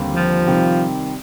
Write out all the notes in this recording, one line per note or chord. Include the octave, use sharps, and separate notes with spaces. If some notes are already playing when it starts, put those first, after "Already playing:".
Already playing: D#2 D3 G3 C4 G4
F3
C3 D#3 G3 C4 G4